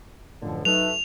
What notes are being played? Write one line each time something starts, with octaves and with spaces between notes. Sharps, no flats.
C#2 F#2 A2 D3 F3
F#3 A3 D#4 B4 F7